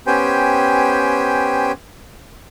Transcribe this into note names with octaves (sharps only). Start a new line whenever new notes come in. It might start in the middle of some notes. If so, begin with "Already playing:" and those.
B3 C#4 G4 C5 G5 G#5